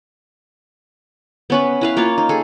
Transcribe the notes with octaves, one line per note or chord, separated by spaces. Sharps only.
B3 C#4 B4
E4 B4 F5
A#3 F4 C#5 F5
D#4
G#4 A4